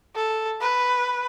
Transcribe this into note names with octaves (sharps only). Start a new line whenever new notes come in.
A4
B4